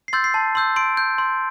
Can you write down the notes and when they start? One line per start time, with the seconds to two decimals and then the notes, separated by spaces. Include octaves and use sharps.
0.08 C7
0.13 C6 E6 G6 A6
0.24 C7
0.34 A5
0.55 C6 E6 G6
0.76 C6 D7
0.97 G6
1.18 C6